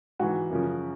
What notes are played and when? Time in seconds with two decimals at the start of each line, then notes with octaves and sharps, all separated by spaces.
0.19 G#2 E3 F#4
0.50 F#2 C#3 F3